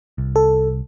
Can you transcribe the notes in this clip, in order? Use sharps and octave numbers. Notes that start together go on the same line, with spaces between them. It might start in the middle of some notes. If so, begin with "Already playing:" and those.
C2
A4